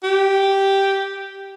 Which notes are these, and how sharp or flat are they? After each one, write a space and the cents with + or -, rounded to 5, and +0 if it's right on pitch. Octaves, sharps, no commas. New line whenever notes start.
G4 -5